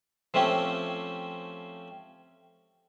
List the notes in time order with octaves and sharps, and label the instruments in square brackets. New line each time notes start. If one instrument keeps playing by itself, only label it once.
[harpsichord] F3 A3 C4 C#4 G4